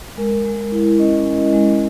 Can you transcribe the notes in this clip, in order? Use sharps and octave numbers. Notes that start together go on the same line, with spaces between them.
G#3 A#4
G#3
E4
C#4 D#5
G#3
G#3